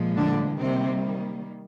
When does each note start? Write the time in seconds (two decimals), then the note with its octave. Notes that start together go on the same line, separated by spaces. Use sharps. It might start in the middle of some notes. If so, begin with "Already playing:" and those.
Already playing: A#2 F3 G#3
0.16 D3 D4
0.59 C3 D#3 G3 A#3 C4